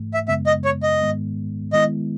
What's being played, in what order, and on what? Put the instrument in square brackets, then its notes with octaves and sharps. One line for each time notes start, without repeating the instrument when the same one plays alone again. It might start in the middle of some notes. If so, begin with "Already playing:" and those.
Already playing: [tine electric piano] G#2 E3 A3
[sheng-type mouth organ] E5
[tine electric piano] F#2 C#3 G#3 B3 [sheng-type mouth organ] E5
[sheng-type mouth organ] D#5
C#5
D#5
[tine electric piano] G#2 D#3 G#3 B3
[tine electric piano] D#3 G#3 B3 E4 [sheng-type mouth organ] D#5